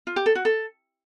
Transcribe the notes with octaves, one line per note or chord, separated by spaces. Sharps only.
F4
G4
A4
F#4
A4